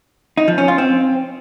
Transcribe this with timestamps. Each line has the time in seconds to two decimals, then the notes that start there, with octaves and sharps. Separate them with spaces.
0.37 D#4
0.48 F3
0.58 C#4
0.68 F4
0.78 C4